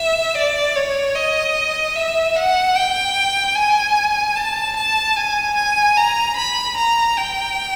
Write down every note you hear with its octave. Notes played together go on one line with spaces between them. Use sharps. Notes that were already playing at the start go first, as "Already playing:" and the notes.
Already playing: E5
D5
C#5
D#5
E5
F#5
G5
G#5
A5
A5
G#5
G#5
A#5
B5
A#5
G5